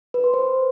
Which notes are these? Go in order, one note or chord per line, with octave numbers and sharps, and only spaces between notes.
B4
C6
C5